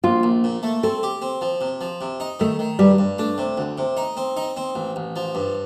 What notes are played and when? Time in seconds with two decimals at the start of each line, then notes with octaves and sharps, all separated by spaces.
0.04 A#1 F4
0.23 A#1
0.44 A#2
0.63 A3
0.83 C4 A4
1.03 G4
1.22 C4
1.41 F3
1.61 C3
1.81 F3
2.01 C3
2.20 D#4
2.40 D#3 A3
2.59 D#3
2.79 G2 G3
2.98 G2
3.18 A3 D4
3.38 C3
3.58 D2
3.78 C3
3.97 D#4
4.17 C4
4.37 D#4
4.57 C4
4.75 A1
4.96 A1
5.16 F3
5.35 G2